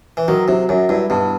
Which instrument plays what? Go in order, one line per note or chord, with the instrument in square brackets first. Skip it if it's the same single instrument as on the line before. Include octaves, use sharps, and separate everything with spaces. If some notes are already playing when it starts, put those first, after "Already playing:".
[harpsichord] E3
[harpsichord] D#3 [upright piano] F#3
[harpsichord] C3 [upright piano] F#3
[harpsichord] F#2 [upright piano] F#3
[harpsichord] G2 [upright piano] E4
[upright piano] G2 [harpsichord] B2